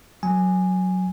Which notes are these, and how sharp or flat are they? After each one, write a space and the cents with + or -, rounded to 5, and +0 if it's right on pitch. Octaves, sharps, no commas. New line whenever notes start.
F#3 +0 G#5 +0